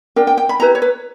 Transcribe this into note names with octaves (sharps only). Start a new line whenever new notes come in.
D4 A#4 G5
G5
G5
B5
E4 G4 B4 A#5
C#5
B4